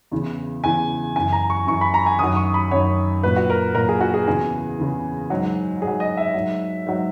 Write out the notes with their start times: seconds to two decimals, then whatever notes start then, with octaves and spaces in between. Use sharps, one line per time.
0.11 E2 C#3 E3
0.64 E2 C#3 E3 G#5
1.16 F#2 E3 G#5
1.33 A#5
1.50 C#6
1.67 F#2 E3 C#6
1.81 B5
1.94 A#5
2.06 G#5
2.19 F#2 D#3 F#3 D#6
2.36 C#6
2.54 B5
2.71 F#2 D#3 F#3 C#5
3.23 A#2 F#3 B4
3.36 F#4
3.50 A#4
3.75 A#2 F#3 A#4
3.89 G#4
4.00 F#4
4.14 G#4
4.28 E2 C#3 E3 G#4
4.79 E2 C#3 E3
5.30 G#2 F#3
5.82 G#2 G#4
5.87 F#3
6.00 D#5
6.17 E5
6.34 G#2 F#3
6.87 G#2 F#3